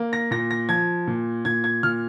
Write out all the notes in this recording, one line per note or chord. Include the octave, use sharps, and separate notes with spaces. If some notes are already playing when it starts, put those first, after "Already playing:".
Already playing: A#3
A#6
A#2 A#6
A#6
F3 G#6
A#2
A#2 G#6
G#6
A#2 F6